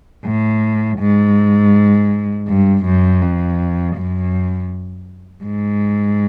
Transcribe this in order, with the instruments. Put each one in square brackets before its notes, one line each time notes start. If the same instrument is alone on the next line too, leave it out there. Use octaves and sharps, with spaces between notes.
[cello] A2
G#2
G2
F#2
F2
F#2
G#2